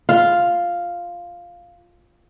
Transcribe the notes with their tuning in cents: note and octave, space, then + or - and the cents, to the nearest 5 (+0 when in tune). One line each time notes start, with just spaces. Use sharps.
F4 +0 F5 +0